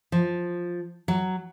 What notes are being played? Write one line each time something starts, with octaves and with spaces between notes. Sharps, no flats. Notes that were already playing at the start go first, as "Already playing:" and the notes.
F3
F#3